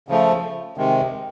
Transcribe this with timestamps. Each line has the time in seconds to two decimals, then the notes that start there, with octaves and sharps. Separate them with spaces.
0.09 C#3 F3 A3
0.77 C3 D#3 G#3